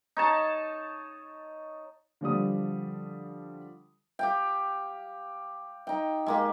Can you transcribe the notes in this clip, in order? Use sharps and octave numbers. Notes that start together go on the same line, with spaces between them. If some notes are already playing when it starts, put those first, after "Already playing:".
D#4 C#5 A5
D3 F3 G3 D#6
G4 F5 G5
D#4 G5
G#3 A#3 G4